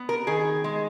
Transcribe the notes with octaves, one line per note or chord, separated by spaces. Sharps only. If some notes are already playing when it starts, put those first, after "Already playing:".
Already playing: B3
A#4
D#3 G#4
G#3